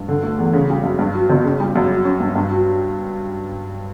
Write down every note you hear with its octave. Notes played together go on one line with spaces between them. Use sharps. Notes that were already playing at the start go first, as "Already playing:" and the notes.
Already playing: G2
D3
A3
E2
C#3
G3
F#2
G2
F#3
G1
C#3
G3
F#2
F#3
C#4
G2
G2
F#3